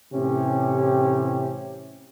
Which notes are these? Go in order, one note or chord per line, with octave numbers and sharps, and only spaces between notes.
A2 C3 E3 C#4 G4